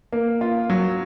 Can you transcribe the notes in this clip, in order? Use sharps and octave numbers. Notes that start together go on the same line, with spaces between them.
A#3
F4
F#3